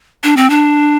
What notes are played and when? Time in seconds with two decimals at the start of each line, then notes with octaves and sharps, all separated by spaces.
0.24 D4
0.37 C4
0.50 D4